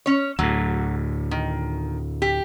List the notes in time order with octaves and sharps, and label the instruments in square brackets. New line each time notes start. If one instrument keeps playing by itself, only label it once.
[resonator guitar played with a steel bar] C#4 C#5
[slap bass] D2 A2 [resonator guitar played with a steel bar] F#3
[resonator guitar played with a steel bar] D#3
G4